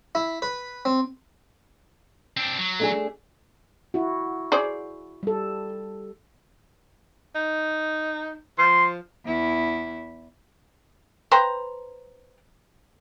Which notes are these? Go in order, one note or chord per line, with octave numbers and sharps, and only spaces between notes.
E4
B4
C4
C4 D4
F#3
A3 D4 G#4
E4 F#4
G#4 C5 D5
G3 A4
D#4
F3 C6
E2 E4
B4 C5 G5 A#5